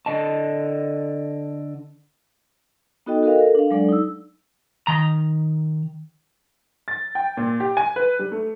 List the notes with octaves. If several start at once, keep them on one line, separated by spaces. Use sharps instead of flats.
D3 D#5 A5
B3 D#4 F#4 A4 D#5 G5
F#4 A4 A#4 D#5 F5
A4 A#4
D4 F5
F#3 G#3 D4 A4 D5
D#4 E6
D#3 A#5
A6
G5
A#2
G4
G#5
B4
G3
A3